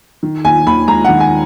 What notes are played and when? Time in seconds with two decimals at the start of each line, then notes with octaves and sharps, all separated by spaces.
0.23 D#3
0.44 D#2 G#5
0.67 D#2 B5
0.87 G#3 A#5
1.05 D#3 F#5
1.20 G#5